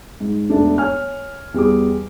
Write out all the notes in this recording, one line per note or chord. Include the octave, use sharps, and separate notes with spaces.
G#2
E1 A3 D4
C#5 G#5 F6
E2 G3 G#4 D6